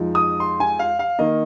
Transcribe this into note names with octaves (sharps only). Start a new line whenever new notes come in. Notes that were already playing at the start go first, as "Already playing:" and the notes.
Already playing: F2 F3 G#3 D#4
D#6
C6
G#5
F5
F5
D#3 A#3 D#5